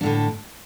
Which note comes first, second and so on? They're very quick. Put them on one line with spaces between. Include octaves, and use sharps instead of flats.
D4 A2 D3